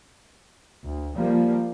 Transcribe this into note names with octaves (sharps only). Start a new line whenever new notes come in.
D2
F3 G3 A#3